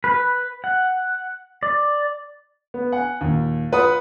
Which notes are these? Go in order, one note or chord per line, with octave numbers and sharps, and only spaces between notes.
B4
F#5
D5
B3
F#5 G#5
D#2 A#2
F4 B4 F#5 D#6